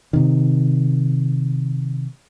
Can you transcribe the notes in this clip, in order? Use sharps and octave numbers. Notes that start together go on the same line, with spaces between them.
C3 D#3